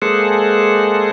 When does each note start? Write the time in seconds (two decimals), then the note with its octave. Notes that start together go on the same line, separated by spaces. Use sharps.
0.02 G#3 A#3 G#4 A4 C5 F#5